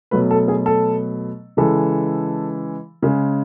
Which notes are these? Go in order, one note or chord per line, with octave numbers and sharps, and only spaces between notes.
B2 F#3 A3 B4
A4
G#4
A4
C#3 E3 G#3 A4
C#3 G#3